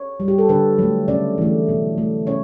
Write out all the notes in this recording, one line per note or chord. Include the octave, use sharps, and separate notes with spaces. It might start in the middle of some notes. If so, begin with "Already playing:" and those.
Already playing: C#5
G3
G4
A4
D3 B4
F#3 A3
C#3 D5
E3 A3
B2
A3
C#3 C#5